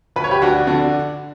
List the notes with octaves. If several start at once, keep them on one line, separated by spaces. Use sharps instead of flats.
D2 B4
C#5
G4 B4
D2 D4 F#4
D3 D4 F#4